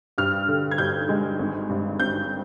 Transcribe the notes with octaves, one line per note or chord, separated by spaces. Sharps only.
G2 F6
D3
G#6
G2 G6
G#3
G#1
G2
G#1 G6